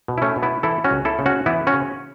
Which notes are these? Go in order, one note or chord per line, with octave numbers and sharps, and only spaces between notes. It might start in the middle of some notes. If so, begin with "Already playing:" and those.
B2
E4
A3 C#4
B2
B3 E4
E3 E4 A4
C#4 F#4
C#2
E4 A4
C#3
C#4 F#4
E3 B3 E4
C#4 F#4
C#3